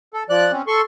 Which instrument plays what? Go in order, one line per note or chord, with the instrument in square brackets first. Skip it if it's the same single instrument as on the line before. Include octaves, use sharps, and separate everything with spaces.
[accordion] A4
F3 D5 F#6
C4 C#4
A4 C6 C#6